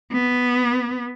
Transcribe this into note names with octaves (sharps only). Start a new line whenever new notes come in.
B3